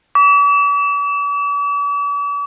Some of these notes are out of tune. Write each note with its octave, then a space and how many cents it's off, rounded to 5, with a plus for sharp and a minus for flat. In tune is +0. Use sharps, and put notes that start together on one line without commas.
D6 -45